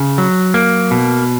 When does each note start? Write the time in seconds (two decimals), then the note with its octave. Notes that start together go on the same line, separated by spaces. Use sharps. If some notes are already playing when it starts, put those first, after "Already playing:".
Already playing: C#3
0.18 F#3
0.54 A#3
0.91 B2